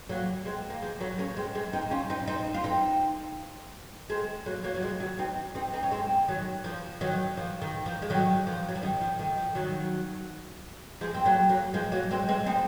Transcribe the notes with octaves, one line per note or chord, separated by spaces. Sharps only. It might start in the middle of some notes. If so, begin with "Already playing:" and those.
F#3 A#3
G#3 C4
A#3
F3 G#3
F#3 A#3
A#3 C#4
G#3 C4
G#3 C4
C4 D#4
C#4 F4
C4 D#4
C4 D#4
F4
C4 D#4
G#3 C4
F#3 A#3
F#3 A#3
F#3
F3 G#3
D#3 F#3
C4 D#4
C4 D#4
C4 D#4
C#4
G#3 C4
D#3 F#3
F3
D#3 F#3
F3
D#3
F3
G#3
D#3 F#3
F3
F#3
F3
D#3
F3
D#3
F3
D#3 F#3
F3 G#3
C4
F#3 A#3
F#3 A#3
F3 G#3
F#3 A#3
G#3 C4
G#3 C4
C4 D#4